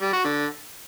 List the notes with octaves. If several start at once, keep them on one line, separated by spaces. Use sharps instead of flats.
G3
F#4
D3